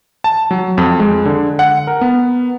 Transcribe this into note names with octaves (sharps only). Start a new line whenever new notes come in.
A5
F#3
F2
G#3
D3
F#5
A#4
B3